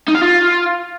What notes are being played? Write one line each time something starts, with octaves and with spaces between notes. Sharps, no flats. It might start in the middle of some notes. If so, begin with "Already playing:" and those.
D#4
F5
F4